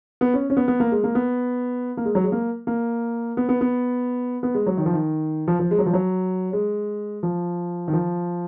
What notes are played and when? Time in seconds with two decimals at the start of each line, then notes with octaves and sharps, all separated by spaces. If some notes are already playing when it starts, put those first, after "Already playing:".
0.21 B3
0.34 C#4
0.50 C#4
0.57 B3
0.68 B3
0.80 A#3
0.92 G#3
1.04 A#3
1.15 B3
1.97 A#3
2.05 G#3
2.15 F#3
2.23 G#3
2.32 A#3
2.67 A#3
3.37 B3
3.49 B3
3.61 B3
4.43 B3
4.55 G#3
4.66 F#3
4.77 D#3
4.86 F3
4.93 D#3
5.47 F3
5.59 F3
5.71 G#3
5.78 F#3
5.86 F3
5.93 F#3
6.53 G#3
7.23 F3
7.88 D#3
7.93 F3